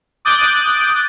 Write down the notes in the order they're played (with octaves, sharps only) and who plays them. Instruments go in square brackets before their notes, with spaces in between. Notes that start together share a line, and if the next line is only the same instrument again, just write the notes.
[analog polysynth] D6 D#6 F#6 G6 A6 D7